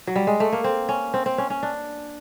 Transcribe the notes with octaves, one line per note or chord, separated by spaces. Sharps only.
F#3
G3
G#3
A3
A#3
C4
C#4
C4
C4
C#4
C#4
D4